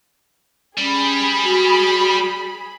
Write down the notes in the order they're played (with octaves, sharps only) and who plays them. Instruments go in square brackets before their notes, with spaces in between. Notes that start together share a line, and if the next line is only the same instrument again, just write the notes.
[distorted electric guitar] G3 [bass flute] C#4 [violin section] G#4 B5
[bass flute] F#4